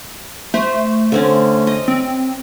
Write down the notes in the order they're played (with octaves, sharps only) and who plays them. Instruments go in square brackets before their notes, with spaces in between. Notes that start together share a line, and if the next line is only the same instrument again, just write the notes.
[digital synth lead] A3 [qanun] C5
[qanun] D3 C4 C#4
D#5
[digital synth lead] C4